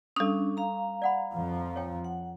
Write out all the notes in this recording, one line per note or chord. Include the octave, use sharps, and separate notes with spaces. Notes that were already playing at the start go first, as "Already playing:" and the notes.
G3 C#4 D4 A4 D#6 E6
F5 A#5
D5 F#5 B5
F2 F3
C#5 G5
F#5